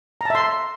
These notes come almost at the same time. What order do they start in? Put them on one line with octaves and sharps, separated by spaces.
A#5 A5 E5 C6